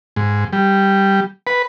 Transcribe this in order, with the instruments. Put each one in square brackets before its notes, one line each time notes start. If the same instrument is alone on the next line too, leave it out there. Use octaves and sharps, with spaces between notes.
[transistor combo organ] G#2
G3
B4